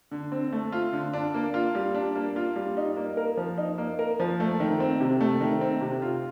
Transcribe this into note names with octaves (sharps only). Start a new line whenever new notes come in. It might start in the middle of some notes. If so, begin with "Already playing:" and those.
D3
C4
A3
F4
D3
D4
A#3
F4
G3
D4
A#3
F4
G3
D#4
A#3
A#4
F3
D#4
A#3
A#4
F3
A3
D#3
C4
C3
A3
D#3
C4
C3
F4